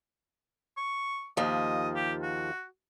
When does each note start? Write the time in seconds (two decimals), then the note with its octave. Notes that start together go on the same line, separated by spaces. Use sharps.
0.77 C#6
1.37 D#2 F3 D#5
1.95 G4
2.23 F#4